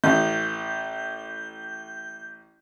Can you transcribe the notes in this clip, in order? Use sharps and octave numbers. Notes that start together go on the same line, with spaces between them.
A1 G6